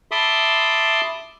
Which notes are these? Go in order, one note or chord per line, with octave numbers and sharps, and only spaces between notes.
E5 A5 B5 C6 D6 D#6